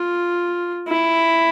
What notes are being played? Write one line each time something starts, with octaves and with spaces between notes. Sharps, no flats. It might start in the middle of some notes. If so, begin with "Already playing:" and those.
Already playing: F4
E4